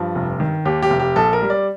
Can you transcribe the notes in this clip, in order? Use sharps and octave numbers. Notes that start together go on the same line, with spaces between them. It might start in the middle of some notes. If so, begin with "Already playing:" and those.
Already playing: G2 F3
F1
D#3
D#2 G4
G4
F1
G4
A#1 A4
A#4
G3
D5